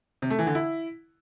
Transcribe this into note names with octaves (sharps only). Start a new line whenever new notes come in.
C3
A3
E3
D3
E4